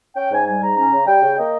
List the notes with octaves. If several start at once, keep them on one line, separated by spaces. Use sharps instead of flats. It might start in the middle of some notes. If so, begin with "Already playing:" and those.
C#4 G5
G#2 G#5
G3 G#5
G#2 A#5
C#4 A#5
C#3
G3 G5
C#3
A#3 D#5